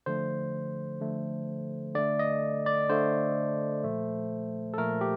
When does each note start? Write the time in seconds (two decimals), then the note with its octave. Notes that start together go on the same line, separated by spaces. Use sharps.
0.06 D3 F3 A3 C5
1.01 D3 F3 A3
1.95 D3 A3 D5
2.19 D#5
2.66 D5
2.89 D3 A3 C5
3.84 A#2 F3 A3
4.74 A4
4.78 A#2 F3 A3 A#4
5.01 G4